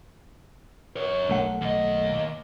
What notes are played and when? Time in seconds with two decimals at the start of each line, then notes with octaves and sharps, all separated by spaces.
0.96 A#4 C#5
1.29 B1 A3 F#5
1.61 D#2 D#5